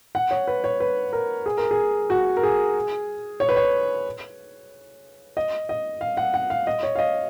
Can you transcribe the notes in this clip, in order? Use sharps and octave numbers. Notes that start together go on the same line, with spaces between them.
F#5
C#5
B4
C#5
B4
A#4
G#4
A#4
G#4
F#4
A#4
G#4
C#5
B4
C#5
D#5
D#5
F5
F#5
F#5
F5
D#5
C#5
F5
D#5